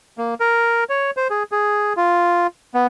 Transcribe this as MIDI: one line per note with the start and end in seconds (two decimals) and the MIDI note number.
0.18 0.34 58
0.40 0.84 70
0.89 1.11 73
1.17 1.28 72
1.30 1.43 68
1.52 1.93 68
1.97 2.47 65
2.74 2.87 59